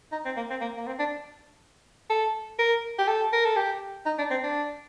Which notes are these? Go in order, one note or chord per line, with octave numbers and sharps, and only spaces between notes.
D#4
C4
A#3
C4
A#3
A#3
C4
D4
A4
A#4
G4
A4
A#4
A4
G4
D#4
D4
C4
D4